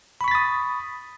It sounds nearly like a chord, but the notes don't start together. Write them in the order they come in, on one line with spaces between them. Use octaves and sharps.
B5 C#6 B6 A6 D#6